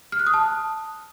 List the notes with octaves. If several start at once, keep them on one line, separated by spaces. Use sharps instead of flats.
F6
F#6
D#6
A5